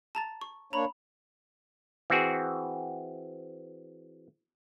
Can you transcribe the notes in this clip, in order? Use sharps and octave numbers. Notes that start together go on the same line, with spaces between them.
A5 A#5 A6
C#6
A#3 D4 C#5 A#5 B5
E3 C4 F#4 G#4